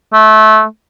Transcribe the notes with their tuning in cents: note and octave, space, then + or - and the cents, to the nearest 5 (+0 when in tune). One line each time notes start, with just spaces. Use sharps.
A3 -20